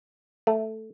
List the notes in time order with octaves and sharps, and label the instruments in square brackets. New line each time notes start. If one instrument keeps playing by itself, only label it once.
[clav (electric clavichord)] A3